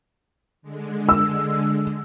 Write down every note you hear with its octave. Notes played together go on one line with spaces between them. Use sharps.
D3 G#3
E6